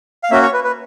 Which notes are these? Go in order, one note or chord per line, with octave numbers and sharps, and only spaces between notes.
F5
A#3 C#4 F#4 E5
C#5
B4
B4